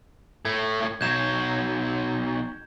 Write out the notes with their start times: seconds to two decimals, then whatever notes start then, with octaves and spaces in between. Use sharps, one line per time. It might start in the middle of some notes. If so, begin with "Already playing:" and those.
0.45 A2 A3 G#6
1.01 B1 F#3 G6 G#6 E7